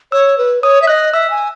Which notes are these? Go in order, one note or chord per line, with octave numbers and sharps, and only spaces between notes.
C#5 E6
B4
C#5 D#6
E5
D#5 F#6
E5 E6
G#5